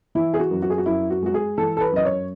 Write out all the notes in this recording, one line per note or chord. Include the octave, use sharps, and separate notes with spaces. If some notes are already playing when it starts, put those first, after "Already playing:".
E3 E4
G#4
F#4
F#2
F#4
G#4
F#4
F#2 E4
F#4
G#3 F#4
G#4
E3 A4
A4
B4
F#2 D#5
C#5